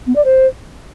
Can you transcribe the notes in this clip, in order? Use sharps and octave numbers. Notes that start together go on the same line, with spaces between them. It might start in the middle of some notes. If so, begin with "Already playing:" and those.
B3
D5
C5